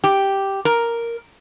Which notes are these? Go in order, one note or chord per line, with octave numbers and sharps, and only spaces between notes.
G4
A#4